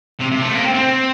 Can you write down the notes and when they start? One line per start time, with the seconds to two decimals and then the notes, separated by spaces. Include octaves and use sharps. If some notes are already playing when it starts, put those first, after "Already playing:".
0.20 C3
0.32 C3
0.42 A3
0.52 A#3
0.64 C4
0.74 C4